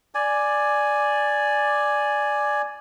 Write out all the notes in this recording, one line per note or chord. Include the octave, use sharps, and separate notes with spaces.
D5 G#5